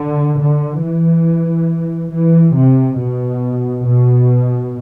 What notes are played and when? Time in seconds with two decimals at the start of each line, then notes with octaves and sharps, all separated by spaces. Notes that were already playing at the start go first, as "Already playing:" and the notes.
Already playing: D3
0.40 D3
0.83 E3
2.12 E3
2.55 C3
2.98 B2
3.85 B2